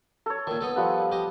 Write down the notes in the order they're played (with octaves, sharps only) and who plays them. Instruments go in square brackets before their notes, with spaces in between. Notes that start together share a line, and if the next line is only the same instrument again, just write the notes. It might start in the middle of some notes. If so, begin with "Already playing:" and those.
[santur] A4 C#5
[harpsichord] A#2 D#3 [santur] E6
[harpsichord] B3 D#4 A4
[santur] F3 G3 F#5
[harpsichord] G4 D#5